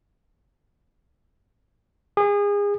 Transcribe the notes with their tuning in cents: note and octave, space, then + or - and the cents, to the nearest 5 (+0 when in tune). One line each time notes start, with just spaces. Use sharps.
G#4 -30